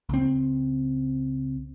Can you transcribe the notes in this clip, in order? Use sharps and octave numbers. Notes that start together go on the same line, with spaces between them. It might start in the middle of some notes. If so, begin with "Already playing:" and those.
C#2 C4